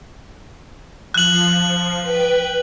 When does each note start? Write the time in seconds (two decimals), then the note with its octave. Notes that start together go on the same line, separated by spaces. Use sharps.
1.14 F3 F#6 F#7
2.02 B4 G5